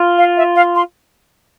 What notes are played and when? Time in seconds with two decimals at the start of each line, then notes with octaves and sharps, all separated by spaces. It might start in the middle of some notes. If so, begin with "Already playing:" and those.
Already playing: F4
0.18 F5
0.37 E5
0.56 F5
0.75 C6